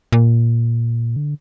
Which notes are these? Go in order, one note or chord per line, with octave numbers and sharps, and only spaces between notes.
A#2
D3